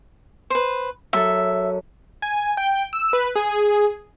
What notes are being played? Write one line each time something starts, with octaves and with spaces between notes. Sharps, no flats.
B4 C5
F#2 A4 E5
G#5
G5
E6
B4
G#4